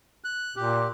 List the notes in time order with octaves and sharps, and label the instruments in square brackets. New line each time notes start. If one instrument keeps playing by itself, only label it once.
[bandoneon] F#6
[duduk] A#2 [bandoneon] G4